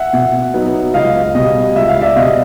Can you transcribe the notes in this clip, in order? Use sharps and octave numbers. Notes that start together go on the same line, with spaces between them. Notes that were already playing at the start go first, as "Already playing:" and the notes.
Already playing: E5 F#5
B2
F#3 B3 D#4
C#2 D#5 F5
B2 G3 D#5
C#2 E5
F5
D5 E5
B2 G3 D#5 F5